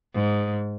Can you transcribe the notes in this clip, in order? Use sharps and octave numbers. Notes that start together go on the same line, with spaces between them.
G#2